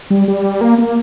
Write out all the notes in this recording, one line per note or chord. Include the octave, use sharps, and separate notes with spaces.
G3
G3
A#3
A#3